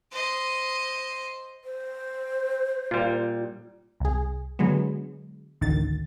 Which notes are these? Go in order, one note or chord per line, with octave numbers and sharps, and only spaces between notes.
C5 D#5
C5
A#2 G3 F4
C2 G#4
D3 F#3 G#3 B3
A1 D2 D#3 A6